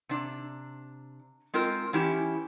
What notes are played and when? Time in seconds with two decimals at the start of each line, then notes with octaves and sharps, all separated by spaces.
0.09 C3 D4
1.54 G#3 C4 F4 A#4
1.93 E3 C#4 E4 G4